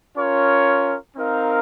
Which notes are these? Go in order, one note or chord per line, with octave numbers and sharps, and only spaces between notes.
C#4 F4 A#4 C#5
C4 D#4 A#4 F5